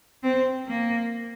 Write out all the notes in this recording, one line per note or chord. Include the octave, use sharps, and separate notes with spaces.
C4
A#3